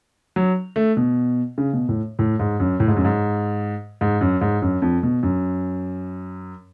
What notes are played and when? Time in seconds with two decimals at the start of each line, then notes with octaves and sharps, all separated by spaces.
0.36 F#3
0.76 A3
0.97 B2
1.58 C#3
1.73 B2
1.89 A2
2.19 A2
2.39 G#2
2.60 F#2
2.80 A2
2.88 G#2
2.97 F#2
3.05 G#2
4.01 G#2
4.21 F#2
4.41 G#2
4.62 F#2
4.82 F2
5.03 B2
5.23 F#2